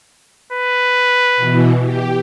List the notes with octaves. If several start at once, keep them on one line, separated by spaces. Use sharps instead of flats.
B4
B2 E3
G4